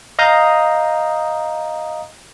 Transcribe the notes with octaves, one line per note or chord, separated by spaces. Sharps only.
D#5 F5 A#5 D#6 G6